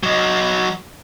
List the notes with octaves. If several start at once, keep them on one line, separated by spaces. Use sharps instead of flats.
F#3 D#5